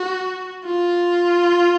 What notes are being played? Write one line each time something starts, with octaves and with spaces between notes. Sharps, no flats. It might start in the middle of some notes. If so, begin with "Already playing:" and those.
Already playing: F#4
F4